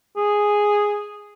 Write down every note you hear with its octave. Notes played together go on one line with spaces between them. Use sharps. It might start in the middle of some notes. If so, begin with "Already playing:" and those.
G#4